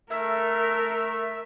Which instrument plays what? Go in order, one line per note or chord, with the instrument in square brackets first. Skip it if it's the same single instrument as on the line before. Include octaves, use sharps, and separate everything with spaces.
[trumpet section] A3 [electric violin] A#4 [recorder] E5